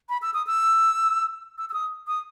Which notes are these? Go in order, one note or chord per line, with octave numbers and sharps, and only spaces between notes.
B5
E6
D#6
E6
E6
E6
D#6
D#6